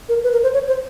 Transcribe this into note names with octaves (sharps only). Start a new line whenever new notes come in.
A#4
B4
A#4
C5
C#5
C5